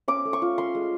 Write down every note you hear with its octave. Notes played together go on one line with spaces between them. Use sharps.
C#4 D6
A3
C#6
F4
C#4 C6
G#3